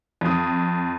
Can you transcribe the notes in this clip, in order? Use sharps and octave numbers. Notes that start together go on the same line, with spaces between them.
F2 D#6